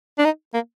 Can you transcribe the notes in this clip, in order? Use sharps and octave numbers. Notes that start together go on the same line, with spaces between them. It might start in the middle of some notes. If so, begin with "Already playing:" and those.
D4
D#4
A#3